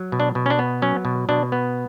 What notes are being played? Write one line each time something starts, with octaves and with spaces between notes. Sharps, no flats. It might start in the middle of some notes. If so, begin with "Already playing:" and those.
Already playing: F#3
B2
D4
B2
C#4
D4
B3
F#3 C#4
B2
B2 D4
B3